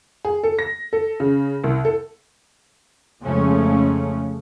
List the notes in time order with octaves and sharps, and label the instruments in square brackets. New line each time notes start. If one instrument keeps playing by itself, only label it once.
[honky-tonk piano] G#4
A4
A#6
A4
C#3
C2
A4
[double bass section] F2 C#3 F3 G#3 A3 C#4